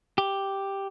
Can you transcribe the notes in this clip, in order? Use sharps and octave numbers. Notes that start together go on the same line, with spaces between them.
G4